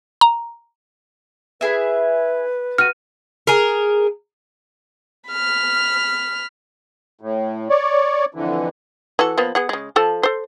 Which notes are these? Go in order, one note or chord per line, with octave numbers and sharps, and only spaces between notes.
A#5
E4 G#4 B4 E5
F#4 F6 D#7
G#4 A#4
B5 F6
A2
C#5 D5
F2 D3 E3
E3 F#4 A4
F3 A#3 B3
B3 G#4 F#5
C#3 G#3
F3 A4 A5
A4 C5